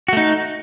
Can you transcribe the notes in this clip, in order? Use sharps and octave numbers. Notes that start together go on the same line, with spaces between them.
A3 D#4 F#4